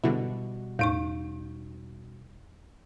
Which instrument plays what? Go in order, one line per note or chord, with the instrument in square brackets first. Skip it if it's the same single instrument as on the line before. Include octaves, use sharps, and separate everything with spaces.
[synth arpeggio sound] G#2 D3 E4 [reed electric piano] B2 G3 F#4
[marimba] E2 D#4 C#6 [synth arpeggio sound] A2